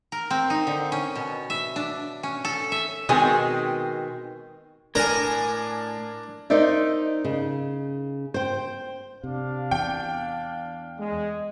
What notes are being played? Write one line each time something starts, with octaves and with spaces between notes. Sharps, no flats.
A#4
C4
D#4
D3
C#4
B2
E5
D4
C#4
A4
E5
B2 D#3 G#3 C4 G#5
A2 D4 A#4 D5 G#5
D#4 A#4 C5 D5 E5
C#3
C5 G5
C3 D4 F5
E2 G5
G#3